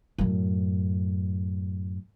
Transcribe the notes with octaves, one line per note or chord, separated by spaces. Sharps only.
F#2 A2